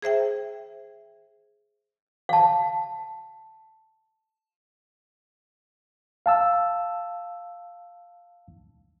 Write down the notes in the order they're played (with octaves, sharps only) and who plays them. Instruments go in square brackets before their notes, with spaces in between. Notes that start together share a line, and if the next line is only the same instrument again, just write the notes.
[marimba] G#4 C5 E5 G5
[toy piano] F5 A5
[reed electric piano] F5 A5 E6